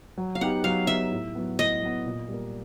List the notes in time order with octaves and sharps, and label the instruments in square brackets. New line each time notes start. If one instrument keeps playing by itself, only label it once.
[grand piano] F#3
[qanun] F5
[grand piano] B3 D#4 G4 [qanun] F#5
[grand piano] F#3 [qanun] F5
[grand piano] B3 D#4 G4 [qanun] E5
[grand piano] A2
F#3 B3
[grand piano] A2 [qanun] D#5
[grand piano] F#3 B3
A#2
G3 A#3